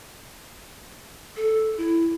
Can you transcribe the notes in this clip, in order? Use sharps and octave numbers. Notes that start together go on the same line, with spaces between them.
A4
E4